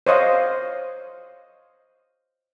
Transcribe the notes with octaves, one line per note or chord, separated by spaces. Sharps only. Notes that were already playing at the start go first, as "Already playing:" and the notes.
C5 C#5 D#5 F5